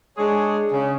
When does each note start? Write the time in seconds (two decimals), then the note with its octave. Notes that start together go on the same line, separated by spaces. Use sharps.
0.18 G#3 D4 G#4 C#5
0.72 C#3